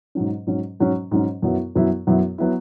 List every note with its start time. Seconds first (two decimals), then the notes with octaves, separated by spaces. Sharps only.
0.15 G#2 F#3 C#4
0.47 G#2 F#3 C#4
0.80 G#2 F#3 C#4
1.11 G#2 F#3 C#4
1.42 F#2 F#3 B3 E4
1.75 F#2 F#3 B3 E4
2.07 F#2 F#3 B3 E4
2.38 F#3 B3 E4